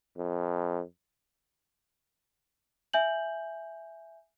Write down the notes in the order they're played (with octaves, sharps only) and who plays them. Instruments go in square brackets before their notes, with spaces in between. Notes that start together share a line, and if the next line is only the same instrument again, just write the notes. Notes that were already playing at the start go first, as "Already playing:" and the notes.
[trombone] F2
[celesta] E5 G#5 G6 F#7